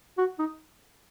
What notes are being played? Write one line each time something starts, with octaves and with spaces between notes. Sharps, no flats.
F#4
D#4